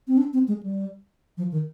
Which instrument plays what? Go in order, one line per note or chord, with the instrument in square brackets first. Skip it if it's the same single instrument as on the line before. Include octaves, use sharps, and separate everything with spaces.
[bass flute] C4
D4
C4
G#3
G3
F3
D#3